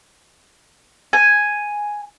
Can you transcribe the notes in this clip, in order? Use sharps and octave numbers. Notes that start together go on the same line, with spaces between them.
G#5